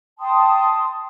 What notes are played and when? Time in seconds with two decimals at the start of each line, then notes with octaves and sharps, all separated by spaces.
0.19 G5 A5 C6 D#6